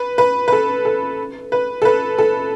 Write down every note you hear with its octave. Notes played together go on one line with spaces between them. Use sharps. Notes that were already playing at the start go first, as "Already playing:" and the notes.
Already playing: B4
B4
B4
A4
A4
B4
A4
B4
A4